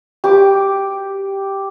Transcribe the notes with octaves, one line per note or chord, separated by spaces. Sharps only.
G4 D6